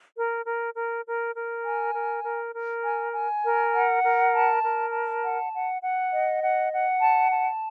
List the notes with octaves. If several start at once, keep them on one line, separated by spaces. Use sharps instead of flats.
A#4
A#4
A#4
A#4
A#4
G#5
A#4
A#4
A#4
G#5
G#5
A#4
F#5
A#4
A5
A#4
A5
F#5
F#5
F#5
D#5
F#5
F#5
A5
A5